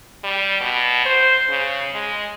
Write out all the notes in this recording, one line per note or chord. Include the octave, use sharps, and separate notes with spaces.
G3
B2
C5
C#3
G#3